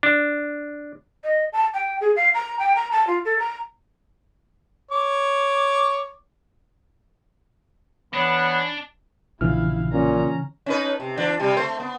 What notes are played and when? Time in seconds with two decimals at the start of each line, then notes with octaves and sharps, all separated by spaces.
0.03 D4
1.24 D#5
1.53 A5
1.74 G5
2.01 G#4
2.16 F5
2.34 A#5
2.59 G5
2.76 A#5
2.92 A5
3.07 F4
3.25 A4
3.39 A#5
4.91 C#5 D6
8.14 E3 B3 D4 C#5 B5
9.41 A#1 C#3 E3 E4 F5 F6
9.93 A#2 C#4 A#5
10.66 C#4 D#4 B4
11.00 C3
11.17 E3 D4
11.40 C3 G3
11.57 A3 C5
11.80 B3